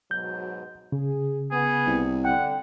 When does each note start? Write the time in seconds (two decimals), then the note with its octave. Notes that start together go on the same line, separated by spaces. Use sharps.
0.11 G#2 B2 F#3 G6
0.92 C#3 G#4
1.51 B3 G#4
1.87 C2
2.25 D3 F#5 G5